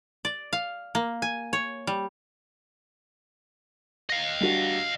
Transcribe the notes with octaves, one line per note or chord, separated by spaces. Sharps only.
D5
F5
A#3
G#5
C#5
G3
D#5 F5
G3 D4 F#4